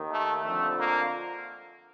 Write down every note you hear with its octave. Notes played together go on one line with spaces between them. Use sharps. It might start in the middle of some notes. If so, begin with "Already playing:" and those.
Already playing: D#2 D#3
A3
F2 D3 F3 A3
A#3